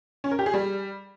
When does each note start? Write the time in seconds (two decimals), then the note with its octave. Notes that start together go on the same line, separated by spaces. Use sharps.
0.24 C#4
0.31 A#4
0.39 G4
0.46 G#4
0.54 G3